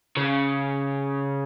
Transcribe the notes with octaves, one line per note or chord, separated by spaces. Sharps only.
C#3